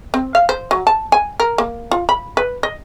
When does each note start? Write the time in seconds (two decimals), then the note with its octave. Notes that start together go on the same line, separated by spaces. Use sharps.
0.14 C4
0.35 F5
0.49 C5
0.71 F#3
0.87 A5
1.12 G#5
1.40 A#4
1.58 A#3
1.91 F4
2.09 B5
2.37 B4
2.63 D#5